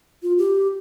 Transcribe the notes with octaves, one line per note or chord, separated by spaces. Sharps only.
F4
G4